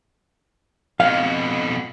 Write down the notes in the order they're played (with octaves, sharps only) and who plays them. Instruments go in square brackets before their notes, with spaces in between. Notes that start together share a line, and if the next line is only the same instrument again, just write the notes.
[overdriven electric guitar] F2 B2 [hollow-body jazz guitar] F5